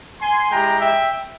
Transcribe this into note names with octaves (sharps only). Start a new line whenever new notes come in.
G#5 C6
G#3 E4 G4 G5 A#5
E5 G5